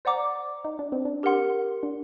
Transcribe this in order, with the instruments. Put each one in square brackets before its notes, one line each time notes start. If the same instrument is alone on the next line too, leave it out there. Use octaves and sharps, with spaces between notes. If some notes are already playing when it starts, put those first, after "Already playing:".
[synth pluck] C5 [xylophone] D5 F#5 A#5 D6
[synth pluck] D#4
D4
C4
D4
[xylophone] G4 A#4 F#5 C6
[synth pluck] D4